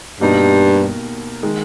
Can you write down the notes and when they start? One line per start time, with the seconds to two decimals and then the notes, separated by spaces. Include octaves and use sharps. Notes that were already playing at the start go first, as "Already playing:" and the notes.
0.20 G2 B2 A#3 D#4 G4 A#4
1.43 D#3 G#3